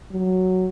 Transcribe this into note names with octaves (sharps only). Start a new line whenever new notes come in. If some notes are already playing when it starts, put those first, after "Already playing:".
F#3